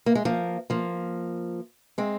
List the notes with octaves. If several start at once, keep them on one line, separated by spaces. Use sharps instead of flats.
A#3
G#3
F3 A#3
F3 A#3
G#3 C4